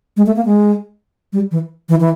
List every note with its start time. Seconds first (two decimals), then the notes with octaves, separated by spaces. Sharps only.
0.17 G#3
0.26 A3
0.36 A#3
0.46 G#3
1.33 G3
1.51 E3
1.89 E3
2.00 E3